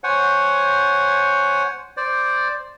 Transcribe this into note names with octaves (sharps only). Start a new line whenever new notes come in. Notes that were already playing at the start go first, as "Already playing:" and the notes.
C5 C#5 F#5 G#5
C5 D5